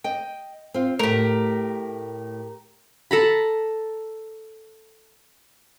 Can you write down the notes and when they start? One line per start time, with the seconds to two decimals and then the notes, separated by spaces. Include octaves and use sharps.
0.04 D#5 G5
0.74 C4 F4
0.99 A2 A3 G4 A#4
3.11 A4 A#5 B5